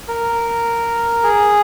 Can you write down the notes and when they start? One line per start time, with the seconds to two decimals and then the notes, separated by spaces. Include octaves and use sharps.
0.08 A#4
1.23 G#4